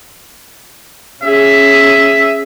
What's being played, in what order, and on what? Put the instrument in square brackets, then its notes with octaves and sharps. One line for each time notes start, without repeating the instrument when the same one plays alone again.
[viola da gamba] C#4 G#4 [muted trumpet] E5